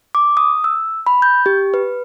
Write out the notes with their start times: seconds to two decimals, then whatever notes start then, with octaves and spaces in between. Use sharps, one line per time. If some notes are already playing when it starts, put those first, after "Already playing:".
0.15 D6
0.37 D#6
0.64 E6
1.07 B5
1.22 G6
1.46 G4
1.74 B4